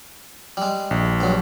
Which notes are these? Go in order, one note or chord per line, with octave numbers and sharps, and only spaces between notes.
G3 G#3
A#1
G2 F#3